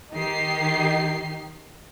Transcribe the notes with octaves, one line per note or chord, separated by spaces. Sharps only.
D#3 D#4 G4 C7